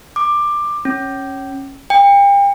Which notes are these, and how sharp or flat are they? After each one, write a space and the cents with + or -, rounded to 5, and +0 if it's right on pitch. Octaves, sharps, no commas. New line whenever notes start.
D6 +15
C#4 -15
G5 +35